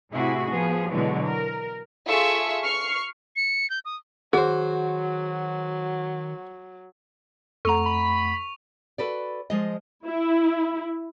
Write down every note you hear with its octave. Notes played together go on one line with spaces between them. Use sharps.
A2 C3 E4 F#4 G#4
F3 B3 G#4
B2 D3 E3 F#3 G#3
A#4
F4 G#4 A4 E5 C#6 E6
C#6 F6 C7 C#7
C#7
G6
D#6
D#3 F#3 F#4 G#4 C5
F2 A3 A4 F#5 A#5 C#6 F7
B5
F#4 A4 B4 D5
F3 G#3 D#5
E4